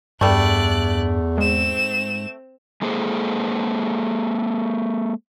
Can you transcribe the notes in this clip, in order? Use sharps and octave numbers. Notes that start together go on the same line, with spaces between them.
E2 G2 G3 A3 D5 F#6
G#2 C4 E7
G#3 A#3 G#4 A4 C5